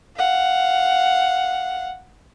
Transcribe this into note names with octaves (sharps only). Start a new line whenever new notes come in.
F5 F#5